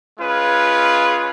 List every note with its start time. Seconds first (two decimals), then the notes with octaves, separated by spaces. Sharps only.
0.19 G#3 C#4 F4 G#4 B4